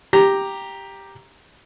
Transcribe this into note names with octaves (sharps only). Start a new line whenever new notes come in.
G4 A#5